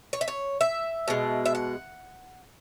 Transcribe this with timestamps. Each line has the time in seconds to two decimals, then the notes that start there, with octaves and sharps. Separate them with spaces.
0.13 C#5
0.21 E5
0.28 C#5
0.61 E5
1.08 B2 G#3
1.46 E5
1.55 F#5